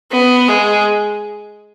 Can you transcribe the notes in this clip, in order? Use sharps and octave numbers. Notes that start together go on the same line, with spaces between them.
B3
G#3